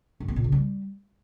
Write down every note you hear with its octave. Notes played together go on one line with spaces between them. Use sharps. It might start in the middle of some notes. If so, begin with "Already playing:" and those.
G2
B3
A#2
C#3
G3